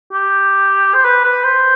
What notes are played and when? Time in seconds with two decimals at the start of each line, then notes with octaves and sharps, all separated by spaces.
0.13 G4
0.94 C5
1.05 B4
1.24 B4
1.45 C5